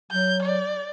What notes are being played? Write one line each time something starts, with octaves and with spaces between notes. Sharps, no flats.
F#3 G6
D5